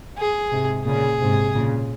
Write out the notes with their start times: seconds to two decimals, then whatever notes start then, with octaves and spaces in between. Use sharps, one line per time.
0.18 G#4
0.52 G#2 C3
0.86 A#2 C#3 G#4
1.20 G#2 C3
1.55 A#2 C#3